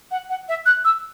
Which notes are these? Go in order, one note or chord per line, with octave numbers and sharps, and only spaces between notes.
F#5
F#5
E5
F#6
E6